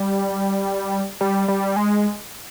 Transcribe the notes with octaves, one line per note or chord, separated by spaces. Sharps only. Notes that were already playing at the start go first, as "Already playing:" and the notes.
Already playing: G3
G3
G3
G#3